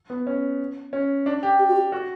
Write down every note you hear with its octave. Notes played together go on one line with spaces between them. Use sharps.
B3
C#4
C#4
D4
G4
G4
F#4
G4
F#4